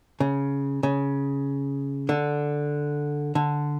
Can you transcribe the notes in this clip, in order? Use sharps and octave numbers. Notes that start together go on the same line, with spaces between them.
C#3
C#3
D3
D3